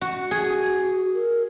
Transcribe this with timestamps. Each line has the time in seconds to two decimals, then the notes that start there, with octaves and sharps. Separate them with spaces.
0.01 F#4
0.31 F#4 G#4
1.14 A#4